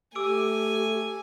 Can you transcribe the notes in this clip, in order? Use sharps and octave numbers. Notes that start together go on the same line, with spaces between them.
A3 G4 G#5 D6 E6 D7